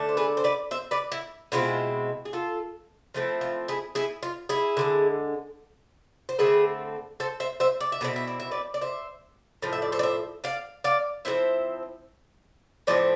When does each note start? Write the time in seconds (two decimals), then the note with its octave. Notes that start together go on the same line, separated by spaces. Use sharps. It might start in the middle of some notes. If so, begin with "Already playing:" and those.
Already playing: D3 A3 D4
0.09 C5
0.17 G#4 B4
0.37 C5
0.44 B4 D5
0.71 C5 E5
0.91 B4 D5
1.12 E4
1.52 B2 G#3 C4 E4 F4
2.25 G#4
2.33 F4 A4
3.14 F3 A3 C4 E4
3.41 F4
3.68 E4 G#4
3.95 E4 G#4
4.23 F4
4.49 E4 G#4
4.77 D3 F3 G#3
6.29 C5
6.38 D3 A3 C4 E4 G#4 B4
7.20 A4 C5
7.40 C5 E5
7.60 C5 E5
7.81 D5
7.92 E5
8.01 B2 A3 C4 E4 D5
8.16 E5
8.27 D5
8.40 E5
8.51 B4 D5
8.74 D5
8.81 C5 E5
9.62 A2 F3 F5
9.73 E5
9.82 D5
9.92 C5 E5
9.99 D5
10.03 C5 E5
10.44 D5 F5
10.84 D5 F5
11.25 F3 A3 C4 E4 C5 E5
12.87 A2 F3 A3 C4 D5